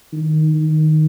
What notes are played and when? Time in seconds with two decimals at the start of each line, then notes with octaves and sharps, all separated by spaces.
0.12 D#3
0.54 D#3